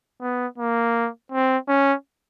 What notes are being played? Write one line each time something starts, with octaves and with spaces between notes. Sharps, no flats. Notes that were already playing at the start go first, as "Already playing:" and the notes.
B3
A#3
C4
C#4